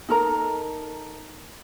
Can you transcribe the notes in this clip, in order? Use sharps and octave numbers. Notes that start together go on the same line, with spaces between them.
D#4 A4 A#4 A#5